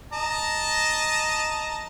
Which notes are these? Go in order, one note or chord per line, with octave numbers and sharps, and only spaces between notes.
D#5 A5 A#5